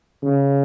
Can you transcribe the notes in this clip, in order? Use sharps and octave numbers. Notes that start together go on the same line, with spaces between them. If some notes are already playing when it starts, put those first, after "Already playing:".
C#3